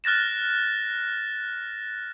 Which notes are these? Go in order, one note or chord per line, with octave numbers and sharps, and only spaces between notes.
F6 F#6 A6 A#6 E7